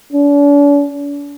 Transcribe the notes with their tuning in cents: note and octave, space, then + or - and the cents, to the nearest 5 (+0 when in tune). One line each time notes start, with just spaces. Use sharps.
D4 -45